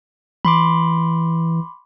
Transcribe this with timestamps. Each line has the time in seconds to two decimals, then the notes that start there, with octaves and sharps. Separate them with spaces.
0.45 E3 B5 C6 D6